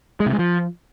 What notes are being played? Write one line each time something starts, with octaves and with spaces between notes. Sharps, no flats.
G#3
C3
G#3
F3